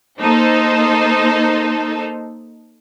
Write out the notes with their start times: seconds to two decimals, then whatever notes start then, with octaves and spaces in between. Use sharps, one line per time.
0.20 A#3 D#4 A4 C5